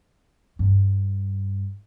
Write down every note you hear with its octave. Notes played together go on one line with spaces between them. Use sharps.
G2